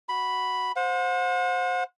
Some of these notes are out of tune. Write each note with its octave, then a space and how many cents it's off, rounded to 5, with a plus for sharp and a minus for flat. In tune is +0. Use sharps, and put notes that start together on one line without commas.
F#4 +0 B5 +0
C5 +0 F#5 -40